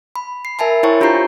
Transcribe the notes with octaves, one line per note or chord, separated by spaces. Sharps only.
B5
C7
A#4 E5 G#5 A5 B5
E4 C5 C#5 G5 A5 C#6
D4 F4 G4 A#5 G6 C7